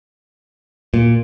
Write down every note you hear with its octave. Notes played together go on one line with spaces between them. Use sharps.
A#2